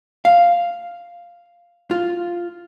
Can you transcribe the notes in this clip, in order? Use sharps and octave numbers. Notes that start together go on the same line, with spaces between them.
F5
F4